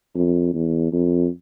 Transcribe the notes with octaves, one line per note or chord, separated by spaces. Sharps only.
F2
E2
F2